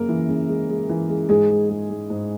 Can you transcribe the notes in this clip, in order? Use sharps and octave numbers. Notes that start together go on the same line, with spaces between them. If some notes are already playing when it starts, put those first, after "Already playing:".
Already playing: F#2 C#3 A#3 A#4
E3
C#3
G#3
G#3
E3
G#3
G#2 G#3 G#4
G#3
G#3
G#3
G#2